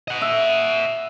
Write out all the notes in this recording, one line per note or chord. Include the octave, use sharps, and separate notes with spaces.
D#5 F#5
E5